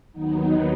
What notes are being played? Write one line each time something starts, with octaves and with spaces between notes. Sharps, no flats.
D#2 D#3 F#3 B3 D#4